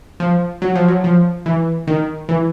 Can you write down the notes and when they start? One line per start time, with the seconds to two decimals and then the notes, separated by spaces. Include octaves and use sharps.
0.20 F3
0.62 F#3
0.75 F3
0.88 F#3
1.04 F3
1.46 E3
1.87 D#3
2.29 E3